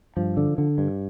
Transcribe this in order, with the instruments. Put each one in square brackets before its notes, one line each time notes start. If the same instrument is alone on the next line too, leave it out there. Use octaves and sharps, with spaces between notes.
[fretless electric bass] G2 F3
D3
D3
G2